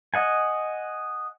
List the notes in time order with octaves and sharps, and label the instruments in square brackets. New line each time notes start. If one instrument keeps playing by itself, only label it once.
[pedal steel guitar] D#5 F#5 G#5